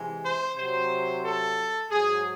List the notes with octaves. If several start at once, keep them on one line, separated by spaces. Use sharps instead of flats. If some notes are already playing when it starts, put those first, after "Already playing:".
Already playing: C3 E3 G#3
C5
C3 F#3 C5
A4
G#2 F#3 G#4